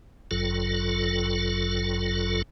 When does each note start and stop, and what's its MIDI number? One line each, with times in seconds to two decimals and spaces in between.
0.31 2.42 31
0.31 2.42 42
0.31 2.42 54
0.31 2.42 65
0.31 2.42 69